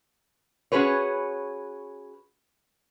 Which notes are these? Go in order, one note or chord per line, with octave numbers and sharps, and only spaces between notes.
C#4 F#4 G#4 B4 C#5